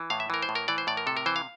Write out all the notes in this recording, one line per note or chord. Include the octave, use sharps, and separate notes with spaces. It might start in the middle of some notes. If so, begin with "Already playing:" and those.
Already playing: E3
A2 F5
E5
E3 A#4
C5
A2
A#4
E3 D5
C5
A2 D5
A#4
C3 A4
A#4
E3 C5
F5